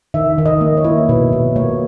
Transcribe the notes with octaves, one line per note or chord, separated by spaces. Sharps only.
D#3 E5
D#3
D#5
A#3
C#5
E4
B2 B4
B2
A#3 C#5